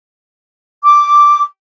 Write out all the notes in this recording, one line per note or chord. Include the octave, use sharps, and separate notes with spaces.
D6